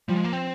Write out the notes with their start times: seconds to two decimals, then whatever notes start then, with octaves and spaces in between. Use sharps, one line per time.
0.09 F3 G3
0.16 G#3
0.24 A#3
0.33 C4